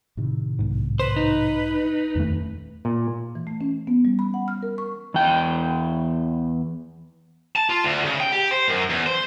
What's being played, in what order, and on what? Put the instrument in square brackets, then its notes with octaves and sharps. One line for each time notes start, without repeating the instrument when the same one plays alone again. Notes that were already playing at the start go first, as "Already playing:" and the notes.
[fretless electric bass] A2 C3 D#3
[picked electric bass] B1 G#2
[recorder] B4 [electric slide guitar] C5
[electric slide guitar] D#4
[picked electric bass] D#1 A3 [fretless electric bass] F2 D#3 C#4
[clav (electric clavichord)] A#2
[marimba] E3
A3
C#4
B3
G3
B5
F#5
F6
A#4
C#6
[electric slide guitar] E2 G5
[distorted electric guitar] A5
F4
D2
C#3
G5
G4
C5
F#2
E2
C5